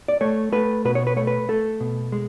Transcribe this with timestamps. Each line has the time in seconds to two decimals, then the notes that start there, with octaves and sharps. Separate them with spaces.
0.08 D5
0.21 A3 C#5
0.52 A3 B4
0.85 B2 B4
0.95 C#5
1.07 B4
1.17 A3 C#5
1.27 B4
1.49 A3 A4
1.80 B2
2.12 G#3